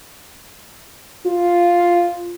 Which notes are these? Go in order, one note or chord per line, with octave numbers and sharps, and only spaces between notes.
F4